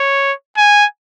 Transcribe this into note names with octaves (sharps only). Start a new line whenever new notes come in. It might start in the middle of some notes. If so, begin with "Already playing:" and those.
Already playing: C#5
G#5